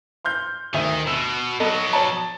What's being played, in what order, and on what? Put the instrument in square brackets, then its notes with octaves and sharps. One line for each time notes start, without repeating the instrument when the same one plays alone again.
[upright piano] C6 F6 G6
[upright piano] D2 E5 [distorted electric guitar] D#3
[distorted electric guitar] B2 [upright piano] E6
[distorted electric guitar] F#3 B3 [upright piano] A4 D#5
[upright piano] C#5 A5